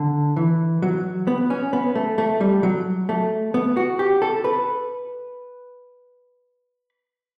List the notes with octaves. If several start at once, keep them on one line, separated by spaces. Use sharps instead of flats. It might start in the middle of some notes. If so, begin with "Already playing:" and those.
Already playing: D3
E3
F#3
B3
C#4
B3
A3
A3
G3
F#3
A3
B3
F#4
G4
A4
B4